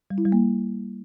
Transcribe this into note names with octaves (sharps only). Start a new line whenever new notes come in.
G3
E4
G3
A#3